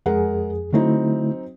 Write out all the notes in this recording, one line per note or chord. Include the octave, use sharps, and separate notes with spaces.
F2 G#3 G#4 A#4 F#5
D3 F#3 A3 C4 D#4 E4